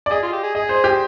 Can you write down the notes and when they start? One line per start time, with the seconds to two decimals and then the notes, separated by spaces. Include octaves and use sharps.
0.06 D5
0.11 G#4 D#5
0.22 F4
0.32 G4
0.43 G#4
0.55 G#4 D#5
0.69 C5
0.84 G4